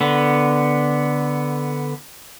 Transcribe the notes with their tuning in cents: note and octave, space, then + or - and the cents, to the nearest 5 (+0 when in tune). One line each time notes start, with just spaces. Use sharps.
D3 +0 B3 +0